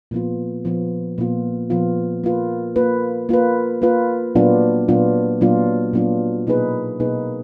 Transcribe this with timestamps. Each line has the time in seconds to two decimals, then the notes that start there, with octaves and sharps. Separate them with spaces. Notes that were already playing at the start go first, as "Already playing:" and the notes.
0.11 A#2 F3 B3 F4
0.64 A#2 F3 B3 F4
1.18 A#2 F3 B3 F4
1.70 A#2 F3 B3 F4
2.24 A#3 F4 B4
2.76 A#3 F4 B4
3.29 A#3 F4 B4
3.82 A#3 F4 B4
4.35 A#2 F#3 B3 D4 F4
4.88 A#2 F#3 B3 D4 F4
5.41 A#2 F#3 B3 D4 F4
5.93 A#2 F#3 B3 D4 F4
6.47 B2 A#3 D#4 G#4 B4
7.00 B2 A#3 D#4 G#4 B4